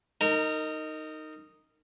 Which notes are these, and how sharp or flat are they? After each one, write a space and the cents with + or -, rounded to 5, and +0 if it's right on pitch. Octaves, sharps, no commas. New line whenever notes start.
D#4 +0 A#4 -25